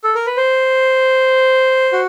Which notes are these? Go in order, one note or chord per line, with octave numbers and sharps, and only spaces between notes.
A4
A#4
B4
C5
F#4